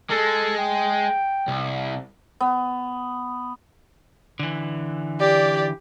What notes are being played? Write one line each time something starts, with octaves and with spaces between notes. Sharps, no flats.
G#3 A4
G5
C2
B3
D3 E3
G4 D5